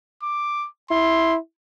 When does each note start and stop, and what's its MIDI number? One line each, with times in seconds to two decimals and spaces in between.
0.23 0.67 86
0.91 1.36 64
0.91 1.36 84